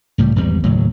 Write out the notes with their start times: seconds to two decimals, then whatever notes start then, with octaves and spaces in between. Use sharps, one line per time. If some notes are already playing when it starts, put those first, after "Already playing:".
0.18 C#2 A2 G3
0.36 G#1 E2 G3
0.63 F#1 D#2 A2 F#3